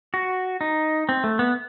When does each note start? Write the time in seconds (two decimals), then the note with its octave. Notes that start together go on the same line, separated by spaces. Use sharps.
0.14 F#4
0.61 D#4
1.09 C4
1.24 A3
1.39 B3